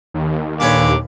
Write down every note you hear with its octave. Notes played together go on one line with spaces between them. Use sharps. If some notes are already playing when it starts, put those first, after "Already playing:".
D#2
A#2 D3 B4 C#5 D6